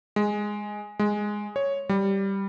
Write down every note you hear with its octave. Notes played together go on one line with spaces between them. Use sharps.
G#3
G#3
C#5
G3